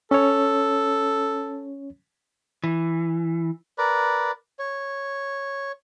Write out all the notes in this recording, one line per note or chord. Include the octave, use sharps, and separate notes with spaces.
C#4 A4 C#5
E3
A#4 B4 D5
C#5